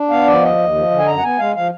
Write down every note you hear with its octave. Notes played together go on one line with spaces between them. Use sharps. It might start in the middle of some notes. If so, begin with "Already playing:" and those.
Already playing: D4
B3 F5
F3 D5
D#2 D#5
D#2
F3
D3
G#5
F#2 A#5
F#5
B3 G#5
G#3 F5
F3 F5